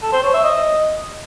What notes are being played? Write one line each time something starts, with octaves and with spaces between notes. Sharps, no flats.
A4
C5
C#5
E5
D#5